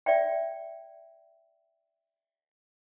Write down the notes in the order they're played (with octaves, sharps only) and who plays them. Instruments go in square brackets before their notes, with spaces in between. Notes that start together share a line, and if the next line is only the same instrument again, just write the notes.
[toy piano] D5 E5 G5